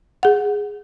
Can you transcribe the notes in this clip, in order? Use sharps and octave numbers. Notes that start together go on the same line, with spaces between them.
G#4 F#5